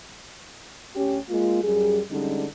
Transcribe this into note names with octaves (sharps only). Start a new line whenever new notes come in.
D2 C#4 G4
G#3 A#3 F4
F#2 G3 G#4
D3 G3 G#3 C#4 D#4